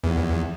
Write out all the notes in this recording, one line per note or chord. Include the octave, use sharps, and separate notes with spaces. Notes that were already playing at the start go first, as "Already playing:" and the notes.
E2